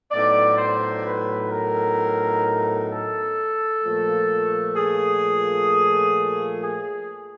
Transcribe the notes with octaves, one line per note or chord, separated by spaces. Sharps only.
A2 F#3 B3 D#4 D5
C5
B4
A#4
A4
A#2 F3 A3
G#4
G#4